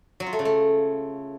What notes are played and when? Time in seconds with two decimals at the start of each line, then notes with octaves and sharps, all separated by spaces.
0.20 F#3
0.26 F4
0.33 A3
0.39 C#3
0.45 A3